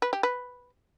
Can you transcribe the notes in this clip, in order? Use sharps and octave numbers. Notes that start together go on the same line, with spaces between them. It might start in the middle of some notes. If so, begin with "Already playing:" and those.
B4
G4
B4